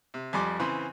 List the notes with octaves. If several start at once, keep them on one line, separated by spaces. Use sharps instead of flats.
C3
F2 G3 G#5 C6 D6
C#3 E3 C4 B5 C6